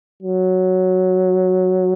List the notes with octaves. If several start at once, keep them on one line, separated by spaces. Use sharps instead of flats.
F#3